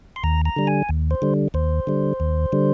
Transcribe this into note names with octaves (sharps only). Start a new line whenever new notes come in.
C6
D#2 A#5
A#5
D3 G3
G#5
D#2
C5
D3 G3
D#2 C5
D3 G3
D#2
D3 G3